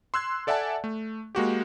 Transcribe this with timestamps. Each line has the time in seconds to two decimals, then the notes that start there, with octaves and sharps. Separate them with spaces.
0.14 C6 E6 F#6 G#6
0.47 A4 D5 E5 F#5 G#5 A5
0.84 A3
1.35 G#3 A#3 F#4 G4